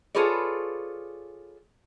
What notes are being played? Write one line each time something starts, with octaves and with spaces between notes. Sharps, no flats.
F4 G#4 A4 B4 C#5 D5